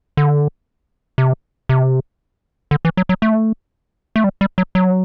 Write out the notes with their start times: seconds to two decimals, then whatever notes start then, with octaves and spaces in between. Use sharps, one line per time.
0.17 D3
1.18 C3
1.69 C3
2.71 D3
2.85 E3
2.97 F#3
3.09 F#3
3.22 A3
4.16 A3
4.24 G3
4.41 G3
4.58 F#3
4.75 F#3